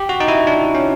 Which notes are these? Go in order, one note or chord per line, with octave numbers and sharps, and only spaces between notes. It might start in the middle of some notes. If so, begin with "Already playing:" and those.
Already playing: G4
F#4
D#4
E4
D4
C#4